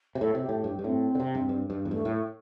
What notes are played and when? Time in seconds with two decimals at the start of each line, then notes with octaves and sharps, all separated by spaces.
0.15 C3
0.20 A2 A4
0.35 C3
0.42 G4
0.49 A2
0.63 G2 G4
0.79 G2
0.84 A2 C4
1.15 D3
1.20 C3
1.35 G2
1.49 G2
1.70 G2
1.85 E2
1.91 G2 A3
2.05 A2